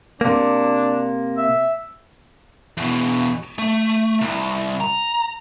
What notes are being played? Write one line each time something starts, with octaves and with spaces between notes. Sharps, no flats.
C3 A#3 D4
E5
E2 B2
A3
C2
A#5